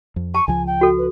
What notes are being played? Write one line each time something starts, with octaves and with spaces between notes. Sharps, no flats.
F2
A5 C#6
C#2 F3 G#5
G5
F#4 A4
B4